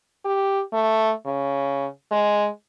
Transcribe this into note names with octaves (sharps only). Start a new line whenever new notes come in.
G4
A3
C#3
G#3